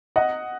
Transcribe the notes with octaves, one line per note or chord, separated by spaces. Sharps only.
D#5 F#5